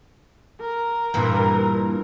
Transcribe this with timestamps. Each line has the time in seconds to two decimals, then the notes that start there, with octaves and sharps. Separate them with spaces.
0.61 A#4
1.14 G2 A#2 E3